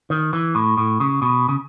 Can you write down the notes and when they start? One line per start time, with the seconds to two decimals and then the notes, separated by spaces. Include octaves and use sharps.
0.10 D#3
0.33 E3
0.55 A2
0.78 A2
1.00 C#3
1.22 B2
1.49 C#3